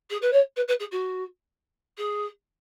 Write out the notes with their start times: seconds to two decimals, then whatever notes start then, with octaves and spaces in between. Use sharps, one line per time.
0.10 G#4
0.22 B4
0.32 C#5
0.56 B4
0.68 B4
0.79 G#4
0.91 F#4
1.97 G#4